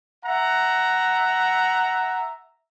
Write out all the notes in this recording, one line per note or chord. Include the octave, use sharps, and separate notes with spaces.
E5 F#5 A#5